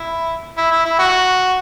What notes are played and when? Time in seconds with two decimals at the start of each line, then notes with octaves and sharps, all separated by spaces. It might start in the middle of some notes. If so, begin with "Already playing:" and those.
Already playing: E4
0.58 E4
0.72 E4
0.85 E4
0.99 F#4